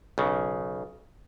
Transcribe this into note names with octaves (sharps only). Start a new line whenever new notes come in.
B1 C#3